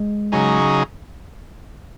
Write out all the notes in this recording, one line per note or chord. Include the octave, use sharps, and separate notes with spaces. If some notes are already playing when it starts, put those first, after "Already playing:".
Already playing: G#3
C#3 F#3 D#4 G#4